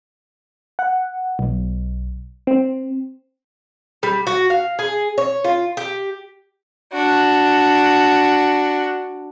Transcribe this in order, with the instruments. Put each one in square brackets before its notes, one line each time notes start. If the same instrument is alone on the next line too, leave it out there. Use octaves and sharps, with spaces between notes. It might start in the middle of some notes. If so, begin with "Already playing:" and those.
[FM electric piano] F#5
B1
C4
[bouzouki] G3
F#4
F5
G#4
C#5
F4
G4
[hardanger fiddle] D4 F#4